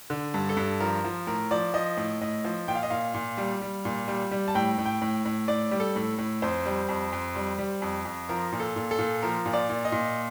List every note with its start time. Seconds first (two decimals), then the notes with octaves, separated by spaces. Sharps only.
0.10 D3
0.34 G2
0.49 A4
0.57 G2
0.80 F3 A#4
1.04 F3
1.27 A2 A#4
1.51 F3 D5
1.74 F3 D#5
1.97 A2
2.21 A2 D#5
2.45 F3
2.68 A#2 G5
2.75 F5
2.83 D#5
2.90 A#2 F5
3.14 A#2
3.37 G3
3.61 G3
3.85 A#2
4.08 G3
4.31 G3
4.48 A5
4.55 A2 G5
4.78 A2
4.85 G5
5.02 A2
5.25 A2
5.48 A2 D5
5.71 G3
5.80 A4
5.96 A2
6.18 A2
6.42 F2 C5
6.66 G3
6.89 F2
7.13 F2
7.36 G3
7.58 G3
7.82 F2
8.05 F2
8.29 F3 A#4
8.52 A#2
8.60 A4
8.76 A#2
8.91 A4
8.99 A#2
9.22 F3 A#4
9.46 A#2
9.53 D5
9.70 A#2
9.85 D#5
9.92 A#2